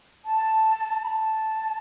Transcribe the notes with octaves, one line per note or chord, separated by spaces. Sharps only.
A5
B5
A5